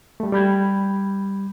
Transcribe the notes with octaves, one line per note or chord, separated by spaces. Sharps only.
G3 A3
G3 B5 G6 G#6